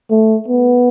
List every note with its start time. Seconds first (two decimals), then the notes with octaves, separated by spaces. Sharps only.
0.10 A3
0.48 B3